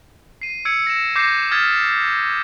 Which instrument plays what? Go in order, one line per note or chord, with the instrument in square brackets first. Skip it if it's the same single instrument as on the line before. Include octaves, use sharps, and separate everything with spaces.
[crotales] C7 D#7
E6 G#6 C#7 D7
A#6 D7 E7
D6 G6 A#6 C7 C#7
D#6 F6 G#6 A6 B6